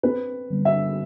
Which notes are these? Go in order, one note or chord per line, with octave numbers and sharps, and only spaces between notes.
C4 B4
G1
E5